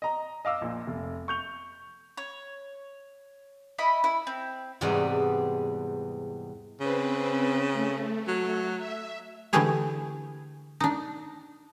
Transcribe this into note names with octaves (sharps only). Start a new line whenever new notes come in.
D#5 A#5
D#5 F5 D6 E6
A#1 A#2
F1
C#6 G6 F7
C#5
E4 D#5 B5
E4
C4
E2 G#2 C3 G3 G#3 B3
C#3 C4 B4
A3
F#3
E5
D3 E3 A3 G4 G#4 C#5
D4 D#4